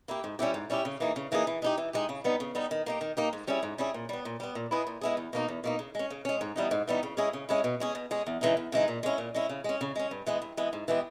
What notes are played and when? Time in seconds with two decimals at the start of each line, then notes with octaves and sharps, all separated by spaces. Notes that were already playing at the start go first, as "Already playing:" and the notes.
0.08 A#3 E4 G4
0.24 G#2
0.39 G3 C#4 E4 G4
0.54 G#2
0.70 G3 C#4 E4 G4
0.85 C#3
1.00 E3 A#3 D#4 G#4
1.16 C#3
1.32 E3 A#3 D#4 G#4
1.47 E3
1.62 G#3 D#4 G4
1.78 E3
1.93 G#3 D#4 G4
2.09 C#3
2.24 G3 B3 D#4
2.40 C#3
2.55 G3 B3 D#4
2.71 D#3
2.86 A#3 D#4 G4
3.01 D#3
3.17 A#3 D#4 G4
3.33 G#2
3.47 G3 C#4 E4 G#4
3.63 G#2
3.78 G3 C#4 E4 G#4
3.94 A#2
4.09 G3 B3
4.25 A#2
4.40 G3 B3
4.55 A#2
4.71 G#3 B3 E4 G#4
4.87 A#2
5.01 G#3 B3 E4 G#4
5.17 E2
5.33 B2 A#3 D#4
5.48 E2
5.64 B2 A#3 D#4
5.79 C#3
5.95 G#3 C#4
6.10 C#3
6.25 G#3 C#4
6.41 G#2
6.56 E3 G3 B3 D#4
6.71 G#2
6.88 E3 G3 B3 D#4
7.03 C#3
7.17 G#3 C#4 E4 G#4
7.33 C#3
7.49 G#3 C#4 E4 G#4
7.64 B2
7.80 G#3 C#4 G#4
7.95 B2
8.11 G#3 C#4 G#4
8.27 E2
8.41 C#3 E3 G#3 D#4
8.57 E2
8.72 C#3 E3 G#3 D#4
8.88 A#2
9.03 G#3 C#4 E4
9.18 A#2
9.35 G#3 C#4 E4
9.49 C#3
9.64 G#3 C#4
9.81 C#3
9.96 G#3 C#4
10.11 G2
10.27 E3 G#3 B3
10.42 G2
10.57 E3 G#3 B3
10.73 G#2
10.88 E3 G#3 B3 G4